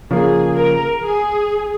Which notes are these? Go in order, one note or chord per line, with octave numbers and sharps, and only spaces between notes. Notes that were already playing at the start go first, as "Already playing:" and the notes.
C#3 F3 A#3 G#4
A#4
G#4